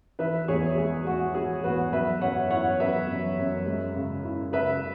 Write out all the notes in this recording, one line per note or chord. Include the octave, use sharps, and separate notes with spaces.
E3 B4 E5
E2 G#4 C#5
G#3 G#4
E2 F#4
E3 G#4
E2 F#4 B4
F#3 B4 E5
F#2 C#5 F#5
E4 C#5 F#5
F#2 B4 E5
F#3
F#2
G#3
C#3
E4
C#3 B4 E5